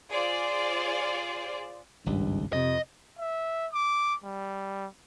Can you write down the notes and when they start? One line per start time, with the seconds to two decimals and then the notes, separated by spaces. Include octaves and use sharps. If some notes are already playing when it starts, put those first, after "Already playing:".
0.12 F4 G#4 C5 D5
2.06 G#1 C#2 G2
2.53 F2 C3 D#5
3.19 E5
3.73 D6
4.24 G3